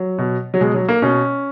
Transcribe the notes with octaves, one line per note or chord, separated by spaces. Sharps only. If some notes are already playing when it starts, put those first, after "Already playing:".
Already playing: F#3
B2
F#3
B2 G#3
F#3
A#3
B2 C#4